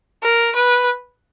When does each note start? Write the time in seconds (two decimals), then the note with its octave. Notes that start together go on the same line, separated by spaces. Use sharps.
0.23 A#4
0.56 B4